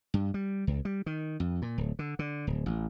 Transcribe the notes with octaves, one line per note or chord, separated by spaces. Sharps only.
G2
G3
C#2
G3
D#3
F2
A#2
D1
D3
D3
D1
A1